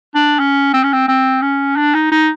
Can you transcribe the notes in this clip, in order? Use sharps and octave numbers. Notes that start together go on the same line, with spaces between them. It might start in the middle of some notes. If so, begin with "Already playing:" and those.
D4
C#4
C4
C#4
C4
C4
C#4
D4
D#4
D#4